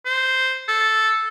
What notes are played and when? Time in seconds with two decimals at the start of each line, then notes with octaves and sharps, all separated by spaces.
0.05 C5
0.68 A4